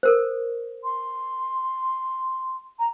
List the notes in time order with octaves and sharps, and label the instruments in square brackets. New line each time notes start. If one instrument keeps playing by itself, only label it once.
[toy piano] A4 A#4 C5
[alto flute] C6
A#5